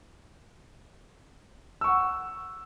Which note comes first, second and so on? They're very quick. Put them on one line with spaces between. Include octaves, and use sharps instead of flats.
E6 C#6 F#5